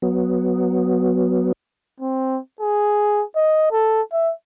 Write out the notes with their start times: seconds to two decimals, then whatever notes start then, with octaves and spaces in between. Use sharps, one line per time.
0.02 F#3 B3
2.00 C4
2.60 G#4
3.36 D#5
3.72 A4
4.12 E5